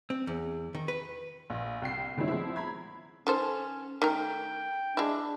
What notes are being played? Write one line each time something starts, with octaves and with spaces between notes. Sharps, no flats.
C4
E2
D#3
B4
A#1
C2 G5 C7
B2 D#3 G3 C#4 E4
F3 G#3 B3 C4 E4
A#5 B5 G#6
D#3 C#4 A4 C5
D#3 A3 A#4 G5
G#3 D4 E4